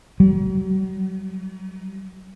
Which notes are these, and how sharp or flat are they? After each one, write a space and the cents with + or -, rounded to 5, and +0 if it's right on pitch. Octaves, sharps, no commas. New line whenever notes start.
F#3 +40